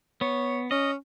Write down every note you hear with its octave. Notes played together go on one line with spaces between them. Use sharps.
B3 C#5
C#4 D#5